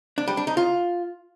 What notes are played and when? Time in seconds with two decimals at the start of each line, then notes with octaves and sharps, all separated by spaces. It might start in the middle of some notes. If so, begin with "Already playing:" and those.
0.18 D4
0.27 G3
0.37 D4
0.47 D#4
0.57 F4